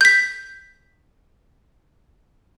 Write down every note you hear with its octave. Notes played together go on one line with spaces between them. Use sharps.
G6 B6